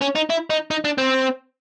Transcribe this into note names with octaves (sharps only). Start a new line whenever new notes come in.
C#4
D#4
E4
D#4
D#4
D4
C4